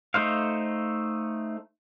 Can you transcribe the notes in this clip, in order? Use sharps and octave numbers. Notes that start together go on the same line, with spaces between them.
A3 D#4 C5 F5